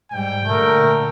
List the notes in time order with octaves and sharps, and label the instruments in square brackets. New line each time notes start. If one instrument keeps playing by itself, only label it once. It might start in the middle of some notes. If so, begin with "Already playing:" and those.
[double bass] G#2 G3 [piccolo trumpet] G5
[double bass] A#2 D3 [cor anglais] A3 [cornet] A#4